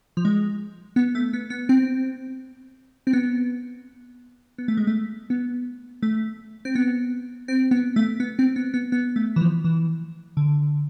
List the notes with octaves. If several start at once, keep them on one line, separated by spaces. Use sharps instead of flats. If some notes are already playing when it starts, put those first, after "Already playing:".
F3
G#3
B3
A3
B3
B3
C4
C4
B3
B3
A3
G#3
A3
B3
A3
C4
B3
C4
B3
A3
B3
C4
B3
B3
B3
A3
E3
F3
E3
D3